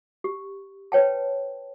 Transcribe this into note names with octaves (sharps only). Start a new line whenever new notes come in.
G4
B4 C#5 G5 A5